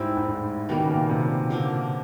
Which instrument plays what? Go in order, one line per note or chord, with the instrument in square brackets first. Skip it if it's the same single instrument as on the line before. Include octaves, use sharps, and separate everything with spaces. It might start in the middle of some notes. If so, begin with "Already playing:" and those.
Already playing: [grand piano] G#2 [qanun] G3 C4 E4
[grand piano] G#2
A2
[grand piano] B2 [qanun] D#3 G3 A#3
[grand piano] C#3
A#2
C3
[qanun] D3 F3 A#3 D4